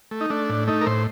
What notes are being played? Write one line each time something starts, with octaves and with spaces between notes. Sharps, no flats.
A3
D#4
A3 D4
A2
A3 D#4
A#4
A2 C5